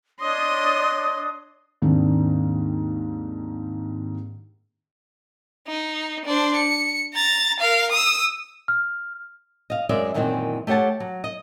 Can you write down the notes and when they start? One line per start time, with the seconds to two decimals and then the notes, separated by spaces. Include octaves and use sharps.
0.21 D4 C#5 D#5 C6 D#6
1.82 D#2 G#2 D#3 C4 D4
5.67 D#4
6.25 D4 C5
6.56 C#7
7.14 A#5 A6
7.59 A#4 F5
7.91 D#6 E6
8.68 F6
9.70 D#5 F5
9.89 F#2 G#3 D5 E5
10.14 F#2 A#2 D#3 E3 G#3 C4
10.67 A3 G4 C#5 F#5 A5
11.00 F#3
11.24 D#5